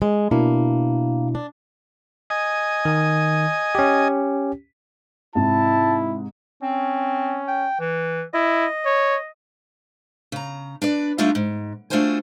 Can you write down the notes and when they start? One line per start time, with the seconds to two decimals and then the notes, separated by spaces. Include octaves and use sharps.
0.02 G#3
0.31 B2 A#3 D4 E4
1.35 D4
2.30 D#5 G#5
2.85 D#3
3.75 C#4 G4
5.35 G#2 C3 E4 A5
6.63 C4 C#4
7.48 G5
7.80 E3
8.34 E4 D#5
8.85 C#5
10.32 C#3 A#5
10.82 D4 B4 D5
11.18 G3 A3 D4 D#4 F4 E5
11.35 G#2
11.90 A3 D4 F4 F#4 C5 G#5